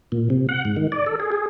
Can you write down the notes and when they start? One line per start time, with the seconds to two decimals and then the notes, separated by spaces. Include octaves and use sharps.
0.12 A#2
0.30 C3
0.49 F#5
0.65 G#2
0.76 D#3
0.92 D5
1.06 A4
1.20 G#4
1.32 G#4